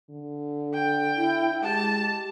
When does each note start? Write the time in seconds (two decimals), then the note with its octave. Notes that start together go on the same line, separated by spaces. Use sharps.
0.10 D3
0.74 G5
1.16 E4
1.63 G#3 G4 A5